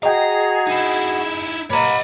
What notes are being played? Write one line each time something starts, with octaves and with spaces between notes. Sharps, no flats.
F#4 G#4 D#5 G5 A#5
D#4 E4
A#2 G4 A#4 C#5 D#5 F#5 A#5 B5